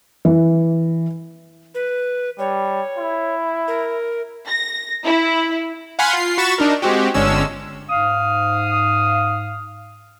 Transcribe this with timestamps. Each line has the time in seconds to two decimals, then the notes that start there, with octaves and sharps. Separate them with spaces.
0.25 E3
1.75 B4
2.39 G3 C#5
2.99 E4
3.68 A#4
4.48 A#6
5.05 E4
5.99 F5 F#5 G#5 B5 C6
6.13 F4 C7
6.38 F#4 B5 C#6 A6 E7
6.58 D4 D#4 A#4
6.82 G#3 C4 F#4 G4
7.14 G1 D3 G#3 C#4 E6
7.90 G#2 F5 D#6